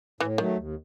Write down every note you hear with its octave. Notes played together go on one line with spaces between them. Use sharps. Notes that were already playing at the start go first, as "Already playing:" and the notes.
A2 E3
D#3 F#3 A3
D#2